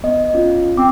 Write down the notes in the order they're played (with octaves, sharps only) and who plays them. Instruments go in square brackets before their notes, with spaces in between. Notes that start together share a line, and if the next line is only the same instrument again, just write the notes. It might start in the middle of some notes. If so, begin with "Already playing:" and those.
[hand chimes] B3 D#5
C#4 F4
[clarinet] C4 [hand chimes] D6